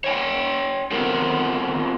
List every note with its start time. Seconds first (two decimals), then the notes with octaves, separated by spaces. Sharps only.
0.04 C#5 G5 G#5
0.91 B3 C4 F4 A4 A#4